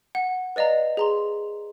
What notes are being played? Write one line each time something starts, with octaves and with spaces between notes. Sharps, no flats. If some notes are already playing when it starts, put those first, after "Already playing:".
F#5
B4 D5 D#5 F5 A#5
G#4 A#5 C6